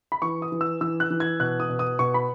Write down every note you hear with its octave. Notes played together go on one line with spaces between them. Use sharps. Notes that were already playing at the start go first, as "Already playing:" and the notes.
B5
E3 C#6
D#6
E3
E6
E3 E6
F#6
E3
G#6
B2 F#6
D#6
B2
D#6
B2 C#6
B5